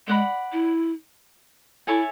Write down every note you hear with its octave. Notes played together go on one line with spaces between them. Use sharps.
G#3 D5 F#5 B5
E4
E4 A4 C#5 E5 G#5